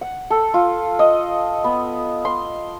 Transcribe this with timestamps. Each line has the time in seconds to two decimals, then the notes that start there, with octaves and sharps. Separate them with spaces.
0.01 F#5
0.30 A4
0.54 F4
0.99 D#5
1.64 B3
2.25 C6